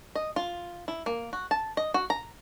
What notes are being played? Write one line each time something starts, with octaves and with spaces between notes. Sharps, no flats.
D#5
F4
E4
A#3
F#4
A5
D#5
F#4
A#5